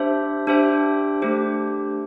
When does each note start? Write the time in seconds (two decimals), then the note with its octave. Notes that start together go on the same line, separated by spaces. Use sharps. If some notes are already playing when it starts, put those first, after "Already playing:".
Already playing: D4 G4 C5 E5
0.47 D4 G4 C5 E5 G5
1.22 A3 D4 G4 C5